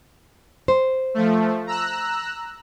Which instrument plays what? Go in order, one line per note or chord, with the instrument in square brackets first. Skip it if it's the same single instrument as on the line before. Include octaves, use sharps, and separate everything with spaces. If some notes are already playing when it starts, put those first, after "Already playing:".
[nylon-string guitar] C5
[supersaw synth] F3 A3
A#5 E6 F#6